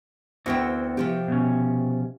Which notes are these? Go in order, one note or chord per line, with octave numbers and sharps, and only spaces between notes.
D2 B3 C4 E4 F#4 G5
C3 F3 G4
B2 C#4